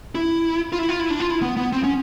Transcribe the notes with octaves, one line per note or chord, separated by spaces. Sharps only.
E4
F4
E4
F4
E4
D4
F4
E4
B3
B3
C4
C#4